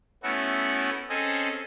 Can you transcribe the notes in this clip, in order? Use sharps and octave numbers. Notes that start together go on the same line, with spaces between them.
A3 B3 C#4 E4 F#4
C4 C#4 G#4 A4 D#5